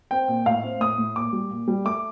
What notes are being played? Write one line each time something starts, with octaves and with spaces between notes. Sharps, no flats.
C4 G5
A#2
A2 F5
C4
A2 D#6
A2
A#2 D6
G3
A#2
G3
A3 D6